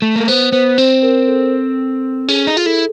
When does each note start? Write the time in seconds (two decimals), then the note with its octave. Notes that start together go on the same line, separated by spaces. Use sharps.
0.02 A3
0.16 A#3
0.27 B3 C5
0.52 B3 C5
0.77 C4 C5
1.03 A#4
1.28 A4
2.28 C#4 G#4
2.47 D#4
2.57 F4
2.66 E4 A4